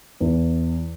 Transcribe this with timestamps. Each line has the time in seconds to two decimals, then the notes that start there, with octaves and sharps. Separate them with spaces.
0.20 E2 E3